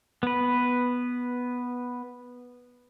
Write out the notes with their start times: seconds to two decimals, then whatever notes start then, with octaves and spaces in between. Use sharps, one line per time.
0.23 B3 B4